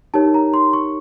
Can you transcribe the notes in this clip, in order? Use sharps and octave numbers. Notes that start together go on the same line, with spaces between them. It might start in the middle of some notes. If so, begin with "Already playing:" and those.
D#4 G4 A#4 C#5 A5
A#5
C6
C#6